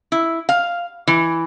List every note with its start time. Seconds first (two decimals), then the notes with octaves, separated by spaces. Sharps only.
0.12 E4
0.49 F5
1.07 E3